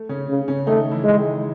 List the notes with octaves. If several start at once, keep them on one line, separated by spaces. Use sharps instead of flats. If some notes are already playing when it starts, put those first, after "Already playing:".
Already playing: A3
C#3 C#4
C#3
C#3 C#4
D#3 A3 D#4
E3 E4
G#3
D#3 D#4